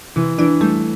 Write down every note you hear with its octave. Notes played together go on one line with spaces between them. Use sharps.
C3 E3
E3 D4
G3 A3